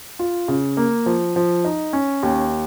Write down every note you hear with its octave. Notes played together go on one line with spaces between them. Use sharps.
F4
C#3
A#3
F3
F3
D#4
C#4
D#2